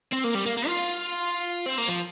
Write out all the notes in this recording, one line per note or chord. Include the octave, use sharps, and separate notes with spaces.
C4
A#3
G3
A#3
A#3
F4
C4
A#3
F3